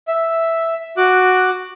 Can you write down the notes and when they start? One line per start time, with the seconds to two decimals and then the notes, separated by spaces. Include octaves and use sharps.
0.08 E5
0.97 F#4 D6 F#6